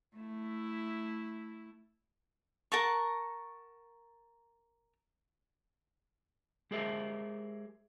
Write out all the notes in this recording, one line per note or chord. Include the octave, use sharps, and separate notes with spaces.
A3 E4
A#4 F#5 A5 C#6
G#3 G4 G#4 A#4 C5 E5